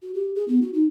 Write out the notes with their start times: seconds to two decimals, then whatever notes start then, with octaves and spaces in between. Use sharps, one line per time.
0.02 F#4
0.15 G4
0.35 G#4
0.48 B3
0.62 F#4
0.73 D#4